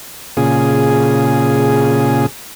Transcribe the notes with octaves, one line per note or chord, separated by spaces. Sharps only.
A#2 C#3 G#4